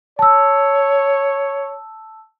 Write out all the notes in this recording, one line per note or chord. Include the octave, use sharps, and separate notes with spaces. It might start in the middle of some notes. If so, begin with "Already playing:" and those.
C#5 A5 E6